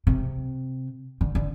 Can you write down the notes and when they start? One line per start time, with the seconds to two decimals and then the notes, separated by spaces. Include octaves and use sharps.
0.07 C3
1.21 D3
1.35 D3